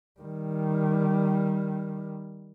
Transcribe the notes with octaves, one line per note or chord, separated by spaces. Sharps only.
D#3 G3